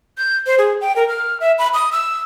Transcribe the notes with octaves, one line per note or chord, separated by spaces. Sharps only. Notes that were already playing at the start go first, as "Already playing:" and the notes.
G6
C5
G#4
G5
A#4
F6
E5
B5
D#6
E6